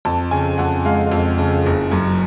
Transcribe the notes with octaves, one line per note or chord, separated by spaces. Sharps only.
F2 A5
C#3 G#5
F2 F#5
G#3 F5
F2
C#3
F#1
F#2